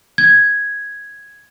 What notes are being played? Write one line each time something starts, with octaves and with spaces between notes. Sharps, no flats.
G#6